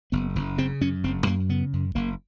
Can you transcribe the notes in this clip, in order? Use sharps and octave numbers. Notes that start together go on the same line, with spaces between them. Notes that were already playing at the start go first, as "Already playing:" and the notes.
F#1 B3
F#1
C#3 C4
F#2 C#4
F#1 C4
F#2 A#3
C#3 B3
F#2
F#1 A#3